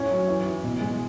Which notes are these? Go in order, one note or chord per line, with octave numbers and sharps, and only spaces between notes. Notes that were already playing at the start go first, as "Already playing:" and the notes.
Already playing: A2 C#4
F#3
E3
E3
B2
G#3